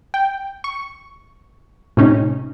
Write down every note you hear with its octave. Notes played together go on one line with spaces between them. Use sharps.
G5
C#6
A2 C3 C#4 D#4